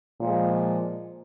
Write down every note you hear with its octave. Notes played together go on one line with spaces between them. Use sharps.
A#2 F3 G#3